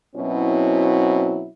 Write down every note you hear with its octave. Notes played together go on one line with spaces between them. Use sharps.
B2 F#3 C4 C#4 E4